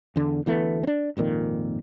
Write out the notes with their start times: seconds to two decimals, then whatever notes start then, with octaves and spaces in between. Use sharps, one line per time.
0.16 E2 D3
0.46 D2 E3 A3 B3
0.83 C4 D4
1.17 G#1 F2 A#2 D#3